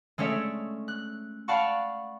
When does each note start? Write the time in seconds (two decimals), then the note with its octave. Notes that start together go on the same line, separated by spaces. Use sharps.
0.18 G#3 A3 C#4 C#5 D5 E5
0.88 F#6
1.48 D5 F5 F#5 A5 B5 C#6